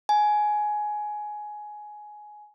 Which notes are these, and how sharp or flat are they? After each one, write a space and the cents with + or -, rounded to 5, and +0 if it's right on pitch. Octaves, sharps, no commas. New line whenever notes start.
G#5 +15